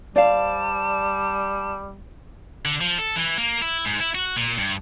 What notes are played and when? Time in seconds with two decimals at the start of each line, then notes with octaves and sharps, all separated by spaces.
0.16 G3 C5 D5 F5 A5
2.65 D3
2.81 F3
2.98 A4
3.16 E3
3.38 A#3
3.62 E4
3.85 G#2
4.00 E4
4.15 F#4
4.37 A#2
4.58 G2